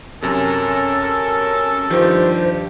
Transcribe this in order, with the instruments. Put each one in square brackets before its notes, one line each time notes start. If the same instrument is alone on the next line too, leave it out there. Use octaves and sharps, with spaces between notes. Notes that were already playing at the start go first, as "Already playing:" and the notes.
[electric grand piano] F#2 C3 [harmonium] C#4 A#4 [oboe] A4
[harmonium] G2 G4 [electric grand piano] D#3 F3 [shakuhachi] C5